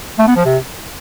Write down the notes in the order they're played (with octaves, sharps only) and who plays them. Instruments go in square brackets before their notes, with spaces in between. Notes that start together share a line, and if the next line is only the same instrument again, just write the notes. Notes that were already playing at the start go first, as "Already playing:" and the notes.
[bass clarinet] A3
B3
F3
C3